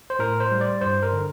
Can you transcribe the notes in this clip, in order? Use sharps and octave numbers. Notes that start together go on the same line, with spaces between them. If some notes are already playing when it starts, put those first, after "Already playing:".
C5
A2 A#4
C5
G3
D5
G2 C5
A#4
D3